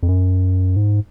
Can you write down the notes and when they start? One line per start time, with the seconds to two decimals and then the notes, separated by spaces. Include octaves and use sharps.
0.03 F2
0.08 F#2
0.76 G#2